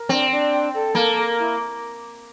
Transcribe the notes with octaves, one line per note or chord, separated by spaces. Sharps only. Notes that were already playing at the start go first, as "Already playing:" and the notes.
Already playing: A#4
C4 D4
D4
G5
A4
A#3 A#4
A#4
E4